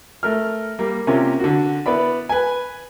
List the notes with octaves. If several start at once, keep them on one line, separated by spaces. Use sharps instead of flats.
A3 A#4 F6
G3 A#3
C3 A#3 C#4 F4 G4
D3 F#4
B3 E4 D5 B5
B4 G#5